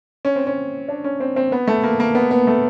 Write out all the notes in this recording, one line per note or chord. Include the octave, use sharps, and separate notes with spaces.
C#4
C4
C#4
D4
C#4
C4
C4
B3
A3
A#3
A#3
B3
B3
A3